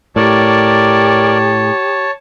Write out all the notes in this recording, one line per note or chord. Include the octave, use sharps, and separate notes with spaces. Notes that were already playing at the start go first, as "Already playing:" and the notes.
A2 G4 A#4 C#5 D5 A5